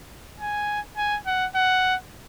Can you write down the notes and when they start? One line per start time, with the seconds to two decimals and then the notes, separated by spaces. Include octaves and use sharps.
0.40 G#5
0.97 G#5
1.26 F#5
1.55 F#5